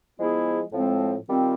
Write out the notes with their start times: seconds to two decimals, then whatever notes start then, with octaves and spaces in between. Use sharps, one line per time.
0.18 F3 G#3 B3 E4 G#4
0.72 A2 F3 G#3 C4
1.28 D#3 G3 C4 F4